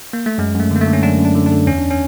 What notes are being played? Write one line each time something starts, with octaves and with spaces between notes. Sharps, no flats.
A#3
A3
F#2 G#3
F#2
A3
D3 A#3
A3
D3
C#4
F#2 D4
F#2
D4
D3
D4
D3
E2 C#4
D4
C#4